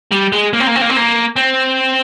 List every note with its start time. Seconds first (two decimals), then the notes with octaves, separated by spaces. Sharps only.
0.12 G3
0.33 G#3
0.53 A#3
0.60 C4
0.67 A#3
0.75 C4
0.81 A#3
0.90 C4
0.97 A#3
1.36 C4